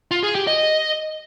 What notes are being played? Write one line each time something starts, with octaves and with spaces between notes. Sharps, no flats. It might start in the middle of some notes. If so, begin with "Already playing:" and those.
F4
G#4
G4
D#5